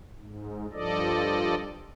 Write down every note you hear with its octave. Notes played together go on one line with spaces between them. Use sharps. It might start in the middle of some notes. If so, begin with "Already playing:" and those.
G#2
G2 F3 A4 D5 D#5